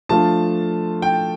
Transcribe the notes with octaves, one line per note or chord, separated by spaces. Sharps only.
F3 A3 D4 F4 A5
G5